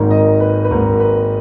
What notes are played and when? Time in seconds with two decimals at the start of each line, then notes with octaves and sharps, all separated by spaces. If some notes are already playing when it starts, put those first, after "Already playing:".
Already playing: G#1 G#2 D#3 A#3
0.11 D#5
0.40 B4
0.64 B4
0.70 G#1 G#2 D#3 A#3 A#4
1.00 B4